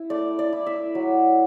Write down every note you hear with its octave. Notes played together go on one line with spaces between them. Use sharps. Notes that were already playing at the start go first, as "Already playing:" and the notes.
Already playing: E4
A3 D5
D5
E4
E5
F#3